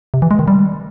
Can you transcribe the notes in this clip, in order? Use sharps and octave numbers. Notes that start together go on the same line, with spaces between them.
C3
E3
G#3
D#3
G3